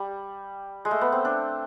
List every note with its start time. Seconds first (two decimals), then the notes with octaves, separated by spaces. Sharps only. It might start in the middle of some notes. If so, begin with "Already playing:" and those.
Already playing: G3
0.85 G#3
0.91 A3
1.01 B3
1.12 C4
1.25 D4